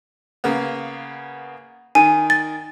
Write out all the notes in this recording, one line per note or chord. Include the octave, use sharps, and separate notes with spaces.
C#3 A#3 B3
D#3 G#5
A6